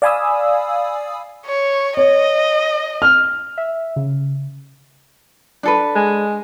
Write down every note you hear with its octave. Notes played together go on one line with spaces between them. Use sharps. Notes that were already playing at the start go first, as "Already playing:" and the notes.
D5 F5 G#5 B5 D#6 E6
C#5
C#5 D#5
F6
E5
C#3
D4 A4 B4
G#3